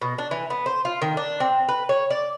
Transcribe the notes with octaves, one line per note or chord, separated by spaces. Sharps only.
B2
D4
E3
B3
C5
F4
D#3
D4
C4
B4
C#5
D5